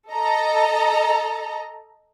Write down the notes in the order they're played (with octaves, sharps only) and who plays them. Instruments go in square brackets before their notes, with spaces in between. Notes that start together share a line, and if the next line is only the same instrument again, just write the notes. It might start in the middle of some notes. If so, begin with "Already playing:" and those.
[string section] A4 D#5 A#5